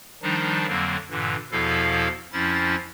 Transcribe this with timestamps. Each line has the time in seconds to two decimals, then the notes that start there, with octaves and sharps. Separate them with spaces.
0.22 D#3 F3 G3 D4 D#4
0.68 F2 D3 F#3 A#3 C4
1.10 G2 A#2 D3 E3
1.52 E2 B2 F3 E4 A4 F5
2.32 F2 F3 C#4 E4 A6